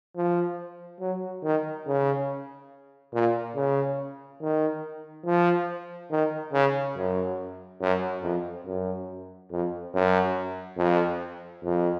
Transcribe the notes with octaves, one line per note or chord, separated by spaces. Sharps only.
F3
F#3
D#3
C#3
A#2
C#3
D#3
F3
D#3
C#3
F#2
F#2
F2
F#2
F2
F#2
F2
F2